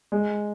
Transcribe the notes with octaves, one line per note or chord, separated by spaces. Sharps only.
G#3